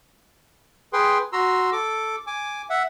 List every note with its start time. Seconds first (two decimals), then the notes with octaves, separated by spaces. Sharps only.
0.93 G#4 B4 G5 C6
1.33 F#4 A#5 C6 E6
1.72 A4 D6
2.27 G#5 D6
2.70 E5 F#5